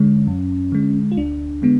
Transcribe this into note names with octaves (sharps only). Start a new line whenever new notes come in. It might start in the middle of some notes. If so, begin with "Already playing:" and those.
Already playing: D3 G#3 C#4
F#2
D3 G#3
F4
D2 D4
D3 G#3 B3